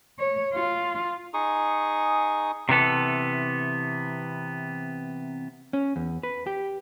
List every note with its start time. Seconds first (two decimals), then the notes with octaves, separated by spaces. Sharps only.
0.19 C#5
0.53 F4
1.34 D#4 G#4 C#6 D#6
2.69 C3 E3 B3 A4
5.73 C#4
5.96 E2
6.23 B4
6.47 G4